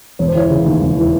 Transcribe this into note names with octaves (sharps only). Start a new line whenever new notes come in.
E1 C#5
C5
E3 C#5
C#3
D#2
E1
E3